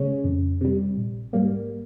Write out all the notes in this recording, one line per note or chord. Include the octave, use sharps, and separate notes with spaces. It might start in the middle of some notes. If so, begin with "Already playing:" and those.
Already playing: C#3 G#3 C#4
F2
C3 G3
A#1
G#2 G3 A#3